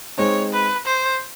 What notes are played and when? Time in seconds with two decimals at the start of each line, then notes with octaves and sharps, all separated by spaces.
0.18 G#3 C4 D#4 C#5
0.52 B4
0.85 C5